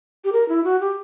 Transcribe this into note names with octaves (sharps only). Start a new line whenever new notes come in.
G4
A#4
E4
F#4
G4